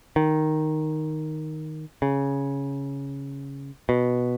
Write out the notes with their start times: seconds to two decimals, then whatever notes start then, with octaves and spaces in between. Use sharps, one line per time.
0.16 D#3
2.02 C#3
3.89 B2